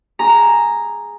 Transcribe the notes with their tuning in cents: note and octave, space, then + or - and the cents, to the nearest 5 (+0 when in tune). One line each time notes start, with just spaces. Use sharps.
G#4 +0 A#5 +0